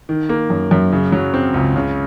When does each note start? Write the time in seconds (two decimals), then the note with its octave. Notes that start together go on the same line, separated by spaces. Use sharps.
0.09 D#3
0.29 A#3
0.50 F#2
0.71 F#2
0.92 C#3
1.12 F#3
1.34 C4
1.54 C#2
1.76 C#3